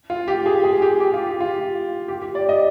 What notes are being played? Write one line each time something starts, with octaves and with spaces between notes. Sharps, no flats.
F4
G4
G#4
G#4
G4
G4
F4
G4
F4
G4
G4
D5
D#5